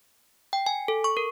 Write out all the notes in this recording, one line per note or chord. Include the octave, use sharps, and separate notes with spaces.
G5
G#5
A4
C#6
A#4